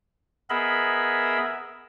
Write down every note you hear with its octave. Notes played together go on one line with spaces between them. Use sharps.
B3 G#4 A#4 D#5 E5 B5